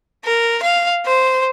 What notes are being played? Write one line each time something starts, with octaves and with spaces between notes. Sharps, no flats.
A#4
F5
C5